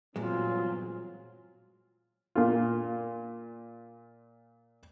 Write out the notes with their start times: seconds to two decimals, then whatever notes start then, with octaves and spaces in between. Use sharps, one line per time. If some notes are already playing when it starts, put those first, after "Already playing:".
0.16 E2 G2 A#2 F#3 G#3 C4 F4
2.35 A#2 F4